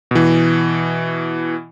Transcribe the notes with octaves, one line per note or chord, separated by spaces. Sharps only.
B2 E3